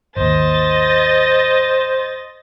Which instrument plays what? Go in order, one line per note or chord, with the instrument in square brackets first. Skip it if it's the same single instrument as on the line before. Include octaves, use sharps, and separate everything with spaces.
[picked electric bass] G#1 D#2 [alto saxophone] C5 [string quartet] D#5 A6